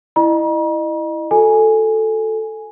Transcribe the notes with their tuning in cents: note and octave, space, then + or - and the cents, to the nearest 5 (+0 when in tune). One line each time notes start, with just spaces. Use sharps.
E4 +0 D#5 -30 A#5 +40
F#4 -25 A4 +0 G#5 +0